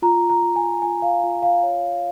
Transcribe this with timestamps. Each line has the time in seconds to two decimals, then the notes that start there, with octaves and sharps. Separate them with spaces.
0.02 F4 A#5
0.30 A#5
0.42 F4
0.56 G#5
0.82 F4 G#5
1.02 F5
1.23 F4
1.42 F5
1.63 C#5